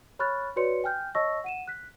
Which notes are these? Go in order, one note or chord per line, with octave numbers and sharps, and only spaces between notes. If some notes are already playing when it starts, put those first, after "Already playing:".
C#5 B5 C#6 F6 F#6 A6
F#4 B4 C#5 D5 C6 C#7
G5 G#5 F6 G6
C#5 D#5 A5 C#6 E6 A#6
F#5 D#7 E7
F#6 B6